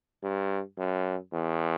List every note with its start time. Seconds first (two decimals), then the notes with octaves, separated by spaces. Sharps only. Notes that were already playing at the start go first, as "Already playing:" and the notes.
0.23 G2
0.78 F#2
1.33 E2